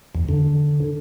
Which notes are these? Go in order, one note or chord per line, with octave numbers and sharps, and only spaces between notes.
E2
D3